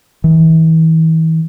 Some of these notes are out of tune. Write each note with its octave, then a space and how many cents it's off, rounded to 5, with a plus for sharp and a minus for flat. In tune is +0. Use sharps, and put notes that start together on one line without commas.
E3 -40